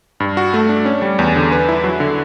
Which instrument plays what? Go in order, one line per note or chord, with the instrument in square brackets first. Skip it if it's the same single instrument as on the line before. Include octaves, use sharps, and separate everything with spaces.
[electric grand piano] G2
F#4
A3
D4
C#4
G3
E2
D3
B4
E4
F#3
D3